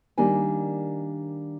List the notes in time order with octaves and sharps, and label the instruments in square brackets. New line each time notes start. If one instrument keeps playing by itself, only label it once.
[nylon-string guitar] D#3 G3 A#3 D4 G#5